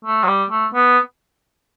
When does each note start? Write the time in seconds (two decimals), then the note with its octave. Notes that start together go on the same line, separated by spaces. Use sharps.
0.05 A3
0.23 F#3
0.28 G3
0.50 A3
0.74 B3